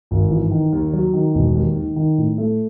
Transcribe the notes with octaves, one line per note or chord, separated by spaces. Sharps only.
G#1
E3
D#3
D#2
F#3
D#3
E1
D#2
D#3
D#3
A2
A3